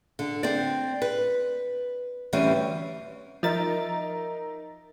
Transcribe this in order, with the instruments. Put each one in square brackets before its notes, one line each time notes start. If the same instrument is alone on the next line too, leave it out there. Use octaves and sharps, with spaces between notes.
[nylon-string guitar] D3
C4 D5
B4
D2 E3 G3 C4 C#4
[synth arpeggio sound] F3 A6 [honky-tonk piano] D#4 A#4 E5